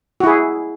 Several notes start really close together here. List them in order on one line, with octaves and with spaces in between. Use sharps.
F#4 E4 G#4